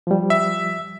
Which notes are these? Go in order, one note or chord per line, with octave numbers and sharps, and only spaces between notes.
F3 G3
E5